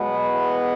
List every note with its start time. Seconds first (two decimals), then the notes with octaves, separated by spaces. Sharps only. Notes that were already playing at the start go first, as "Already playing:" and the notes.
Already playing: B2 F#3 G#3 B3
0.28 A2 E3